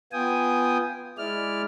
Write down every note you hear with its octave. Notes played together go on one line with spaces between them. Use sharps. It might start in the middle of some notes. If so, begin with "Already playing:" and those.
B3 F4 G5 G#5 D#6
G#3 E4 D5 F6